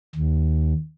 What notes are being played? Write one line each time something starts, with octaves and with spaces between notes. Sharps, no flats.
D#2